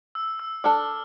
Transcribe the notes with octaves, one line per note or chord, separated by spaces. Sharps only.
E6
E6
D4 A4 D5 F6